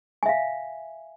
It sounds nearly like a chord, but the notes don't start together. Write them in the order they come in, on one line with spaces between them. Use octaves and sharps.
G#5 E5 F5